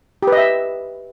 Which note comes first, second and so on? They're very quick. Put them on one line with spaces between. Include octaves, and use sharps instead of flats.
G4 B4 D#5 E5